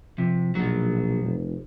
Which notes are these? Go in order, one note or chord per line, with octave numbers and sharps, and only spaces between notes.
C3 F3
A#1 B2 F#3
F1